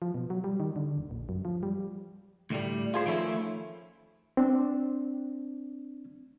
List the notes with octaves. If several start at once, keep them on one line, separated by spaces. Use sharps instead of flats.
F3
B2
F#3
G3
D#3
D3
E1
A#1
F#2
F3
G3
D2 A2 G3
F4 G#4 C5
D#3 F3 A3 C#4 E4
C4 D4